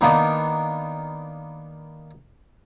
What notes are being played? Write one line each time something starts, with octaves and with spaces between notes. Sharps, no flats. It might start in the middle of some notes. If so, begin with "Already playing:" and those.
D#3 A#3 B3 D4